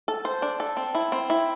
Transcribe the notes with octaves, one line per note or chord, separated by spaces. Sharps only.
A4
C5
D4
A4
C4
E4
C4
E4